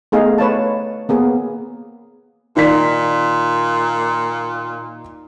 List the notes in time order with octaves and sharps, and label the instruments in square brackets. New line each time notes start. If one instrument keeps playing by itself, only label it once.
[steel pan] A3 B3 D#4 G#4 F5
B4 C#5 F5 A5
A#3 B3 G#4
[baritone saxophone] A#2 [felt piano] D#3 D5 B6